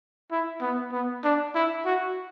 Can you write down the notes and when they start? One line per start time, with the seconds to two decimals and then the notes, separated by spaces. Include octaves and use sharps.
0.31 E4
0.61 B3
0.92 B3
1.24 D4
1.55 E4
1.85 F#4